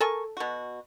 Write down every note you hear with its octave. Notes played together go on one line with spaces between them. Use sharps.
A4 A#4 G#5 C#6
B2 F#4